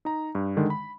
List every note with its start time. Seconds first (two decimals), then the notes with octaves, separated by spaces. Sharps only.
0.05 D#4 A#5
0.35 G2
0.57 D3 D#3 G#3
0.70 B5